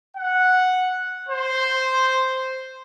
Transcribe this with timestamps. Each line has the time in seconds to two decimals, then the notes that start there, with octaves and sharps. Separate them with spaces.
0.17 F#5
1.29 C5